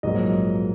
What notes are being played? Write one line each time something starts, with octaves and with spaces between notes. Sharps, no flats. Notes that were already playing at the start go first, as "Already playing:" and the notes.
A#1 G#2 F#3 A#3 D#5